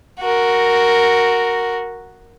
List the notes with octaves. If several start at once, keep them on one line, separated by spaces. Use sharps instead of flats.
F#4 A#4